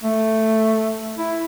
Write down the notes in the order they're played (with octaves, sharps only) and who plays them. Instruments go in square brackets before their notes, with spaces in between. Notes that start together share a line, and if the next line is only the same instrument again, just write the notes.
[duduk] A3
E4